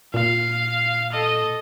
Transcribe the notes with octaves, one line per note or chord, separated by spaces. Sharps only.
A#2 F5
A4 D#5